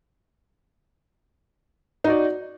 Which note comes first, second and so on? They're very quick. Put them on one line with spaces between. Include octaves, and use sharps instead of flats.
D#4 F#4 D5